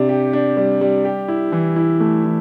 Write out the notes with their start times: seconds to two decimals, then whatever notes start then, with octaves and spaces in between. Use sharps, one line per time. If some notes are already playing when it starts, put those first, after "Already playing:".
Already playing: C3 D4
0.09 G4
0.33 D4
0.57 G3
0.81 G3
1.05 G4
1.28 E4
1.52 E3
1.76 E4
2.00 A3
2.25 E3